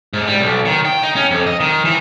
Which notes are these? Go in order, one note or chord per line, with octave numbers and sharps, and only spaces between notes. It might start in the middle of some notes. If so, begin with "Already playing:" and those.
G#2
G3
B1
D#3
G5
D#4
C#4
F2
D#5
D#3
E3